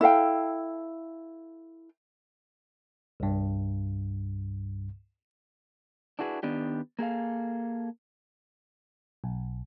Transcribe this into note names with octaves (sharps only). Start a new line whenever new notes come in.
E4 A4 F5 G5
C2 G2
D4 E4 F#4 G#4 A#4 B4
D#3 B3 D4 G4
A#3 G#4 A4 F5
B1